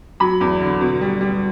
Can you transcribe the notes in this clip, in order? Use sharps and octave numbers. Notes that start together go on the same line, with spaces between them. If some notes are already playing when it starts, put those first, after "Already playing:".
F#3 B5
E2
D3
B2
G3
G3